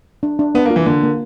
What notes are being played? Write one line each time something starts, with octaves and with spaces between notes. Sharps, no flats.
D4
D4
B3 D4
A#3
F4
E3
D3 A#3
A#3